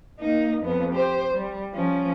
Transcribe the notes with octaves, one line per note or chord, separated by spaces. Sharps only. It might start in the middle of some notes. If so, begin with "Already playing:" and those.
A#3 D#4
F2 B3
G4 C5
G3
F3 C#4